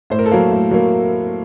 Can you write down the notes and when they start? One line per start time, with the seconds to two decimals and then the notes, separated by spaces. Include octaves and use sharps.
0.10 A2 C5
0.19 A#4
0.26 A4
0.31 F#3 A#3 A#4
0.52 A2
0.71 F#3 A#3